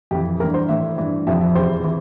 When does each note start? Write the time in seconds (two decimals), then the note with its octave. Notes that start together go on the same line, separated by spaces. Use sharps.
0.11 F2 G4
0.15 E3
0.40 G2 E3 A#4
0.54 C5
0.68 A2 E3 E5
0.98 G2 E3
1.27 F2 C3 F3 E5
1.41 E5
1.55 E2 C3 E3 C5
1.84 E3